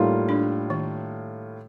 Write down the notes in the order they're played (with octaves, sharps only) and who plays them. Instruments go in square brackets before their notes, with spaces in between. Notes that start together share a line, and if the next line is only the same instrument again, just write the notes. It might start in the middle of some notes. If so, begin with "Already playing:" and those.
Already playing: [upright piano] A2 G3 A#3 F4 [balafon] D#4
[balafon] D4
D#3